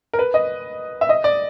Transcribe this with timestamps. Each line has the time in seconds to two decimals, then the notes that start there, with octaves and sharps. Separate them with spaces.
0.13 A#4
0.19 B4
0.34 D#5
1.01 E5
1.09 D#5
1.24 D5